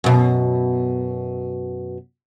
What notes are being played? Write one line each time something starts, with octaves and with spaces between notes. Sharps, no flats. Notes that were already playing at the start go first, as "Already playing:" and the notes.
F#2 B2